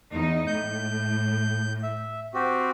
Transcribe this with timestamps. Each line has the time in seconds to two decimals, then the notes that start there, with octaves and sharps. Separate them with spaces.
0.12 E2 D#4
0.47 A2 G6
1.83 E5
2.34 C4 F#4 G4